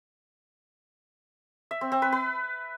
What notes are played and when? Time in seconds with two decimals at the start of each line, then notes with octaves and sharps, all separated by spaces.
1.71 E5
1.81 C4
1.92 C4
2.02 B4
2.12 B4